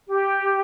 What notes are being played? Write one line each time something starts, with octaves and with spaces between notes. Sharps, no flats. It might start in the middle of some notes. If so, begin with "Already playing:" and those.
G4